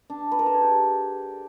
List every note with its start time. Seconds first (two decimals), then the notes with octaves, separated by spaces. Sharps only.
0.10 D4
0.31 B4
0.39 A#4
0.46 A4
0.54 G#4
0.61 G4